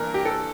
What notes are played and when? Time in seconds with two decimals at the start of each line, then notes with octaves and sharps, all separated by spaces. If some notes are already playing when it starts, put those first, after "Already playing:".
Already playing: G2 E3 A#3 A#4
0.14 G4
0.25 A4